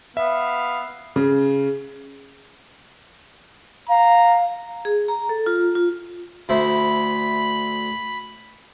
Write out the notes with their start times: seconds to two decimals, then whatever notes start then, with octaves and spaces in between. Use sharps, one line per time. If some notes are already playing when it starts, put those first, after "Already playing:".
0.17 B3 E5 F5
1.16 C#3
3.89 F5 A#5
4.85 G#4
5.08 A#5
5.29 A4
5.46 F4
5.75 F4
6.49 D2 E4 C5 B5